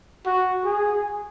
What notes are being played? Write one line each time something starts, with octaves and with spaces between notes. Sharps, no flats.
F#4
G#4